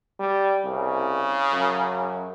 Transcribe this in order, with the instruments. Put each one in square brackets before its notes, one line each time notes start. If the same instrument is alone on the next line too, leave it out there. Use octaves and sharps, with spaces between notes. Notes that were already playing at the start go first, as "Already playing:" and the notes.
[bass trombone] G3
[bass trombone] C2 [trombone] C#3
[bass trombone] F#2